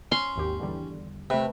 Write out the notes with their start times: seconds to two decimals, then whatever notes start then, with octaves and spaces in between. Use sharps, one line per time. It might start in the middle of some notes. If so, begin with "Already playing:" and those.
0.12 C#4 C6
0.36 G#1 D#2 G4
0.59 E2 D3 G3
1.30 C3 A3 B4